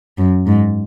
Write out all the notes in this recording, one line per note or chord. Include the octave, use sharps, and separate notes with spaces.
F#2
G#2